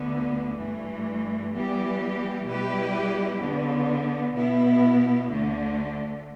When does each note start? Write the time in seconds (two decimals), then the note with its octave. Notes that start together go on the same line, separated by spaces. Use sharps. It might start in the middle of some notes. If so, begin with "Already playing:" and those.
Already playing: D2 D3 B3
0.57 G2 E3 A3
1.52 E3 G3 B3 G4
2.45 B2 G3 E4 G4 B4
3.40 E2 D3 B3
4.33 B2 B3 E4
5.27 D2 D3 A3